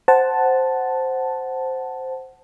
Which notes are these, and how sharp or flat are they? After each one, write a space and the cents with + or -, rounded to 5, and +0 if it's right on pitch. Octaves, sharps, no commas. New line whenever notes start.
C5 +0 F#5 +10 A5 +0